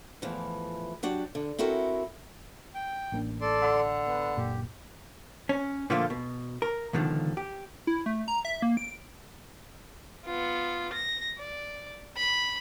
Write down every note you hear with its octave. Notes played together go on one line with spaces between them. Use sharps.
E2 A2 E3 F3
F#3 D4 F#4 G4
D3
C4 E4 F#4 A4 A#4
G5
A1 A#3 D4
A4 D5 C6
D3
B3
F#1 A#2 G4
C#4
A#2 D3 F3 A3 A#3 F4
B2
A#4
C#2 B2 D3 D#3 F3
G4
E4
A3
A#5
E5
A#3
D7
B3 F4
A#6
D5
B5